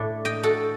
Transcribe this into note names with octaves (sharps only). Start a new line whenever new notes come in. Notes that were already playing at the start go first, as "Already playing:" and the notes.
Already playing: A2 A3 D4
D#5 G5
F#4 A4